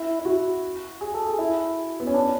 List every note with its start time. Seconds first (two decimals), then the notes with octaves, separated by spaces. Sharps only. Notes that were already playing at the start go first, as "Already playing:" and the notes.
Already playing: E4
0.19 E4
0.25 F#4
1.01 G#4
1.14 A4
1.27 G#4
1.39 E4
2.00 B3
2.07 C#4
2.14 D4